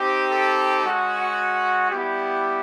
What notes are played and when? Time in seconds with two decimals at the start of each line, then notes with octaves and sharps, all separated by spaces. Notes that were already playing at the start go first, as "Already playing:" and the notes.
Already playing: C4 D#4 G4
0.31 A4
0.85 G#3 C#4 F#4
1.91 G3 B3 E4 G4